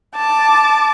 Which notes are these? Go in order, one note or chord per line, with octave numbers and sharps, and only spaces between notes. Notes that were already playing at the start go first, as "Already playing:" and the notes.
A5 D6